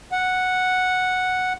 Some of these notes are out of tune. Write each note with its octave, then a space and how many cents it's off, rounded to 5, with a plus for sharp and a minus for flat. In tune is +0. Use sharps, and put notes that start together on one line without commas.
F#5 -5